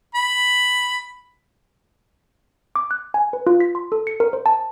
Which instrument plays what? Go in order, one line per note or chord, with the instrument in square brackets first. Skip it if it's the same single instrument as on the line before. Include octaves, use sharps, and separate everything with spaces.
[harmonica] B5
[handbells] D6
F#6
G#5
B4
F4
B6
C6
A4
C#7
A#4
C5
A5